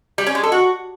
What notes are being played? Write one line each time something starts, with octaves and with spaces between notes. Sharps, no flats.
G3
C#4
G#3
A4
F#4